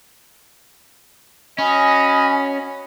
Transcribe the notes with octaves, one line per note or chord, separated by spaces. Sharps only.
C#4 F#4 D#5 G#5 B5